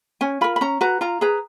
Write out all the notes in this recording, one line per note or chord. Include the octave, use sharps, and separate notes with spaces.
C#4 G#5
F4 A#4 B5
B5
C#4 A#5
F#4 B4 A#5
F4 A#5
G#4 B4 A#5